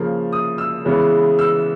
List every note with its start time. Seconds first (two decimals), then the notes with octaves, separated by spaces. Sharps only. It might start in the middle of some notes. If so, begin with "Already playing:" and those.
Already playing: C#3 F3 A#3
0.33 D#6
0.58 E6
0.85 C#3 E3 G#3 B3
1.39 E6